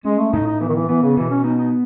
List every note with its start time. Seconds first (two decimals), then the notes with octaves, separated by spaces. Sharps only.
0.04 G#3 C#4
0.19 A3
0.33 A2 D#4
0.46 D#4
0.61 E3 B3
0.69 D#3
0.75 E3
0.89 E3 B3
1.03 C#3
1.17 B2 E3
1.30 C#4
1.43 B3 D#4
1.58 D#4